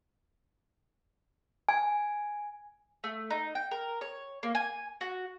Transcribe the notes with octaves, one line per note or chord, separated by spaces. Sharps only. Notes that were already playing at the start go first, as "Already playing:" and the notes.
G#5
A3
D#4
G5
A#4
C#5
A#3
G#5
F#4